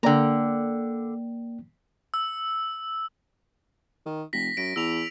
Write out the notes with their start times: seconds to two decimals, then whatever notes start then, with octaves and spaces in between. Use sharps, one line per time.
0.03 D3 A#3 D5 G5 A#5
2.14 E6
4.06 D#3
4.33 F1 A#6 B6
4.57 F#2 A#6 D7
4.76 E2 E6 F7